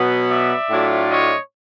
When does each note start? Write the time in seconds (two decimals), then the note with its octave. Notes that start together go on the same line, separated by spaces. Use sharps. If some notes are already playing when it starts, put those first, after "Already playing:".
Already playing: B2 F#3 B3
0.30 D5 E5
0.70 A2 F#3 A3 D4 F4
1.09 C#5 D#5